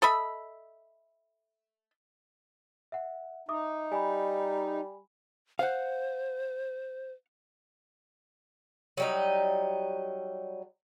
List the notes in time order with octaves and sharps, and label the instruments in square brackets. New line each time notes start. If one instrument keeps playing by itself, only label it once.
[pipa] A4 D#5 E5 B5
[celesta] E5 F#5
[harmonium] D#4 [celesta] E5 D6 D#6
[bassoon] G3 [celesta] G#5 B5
[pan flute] C5 [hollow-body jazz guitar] F5 F#5
[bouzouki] F#3 G3 D#4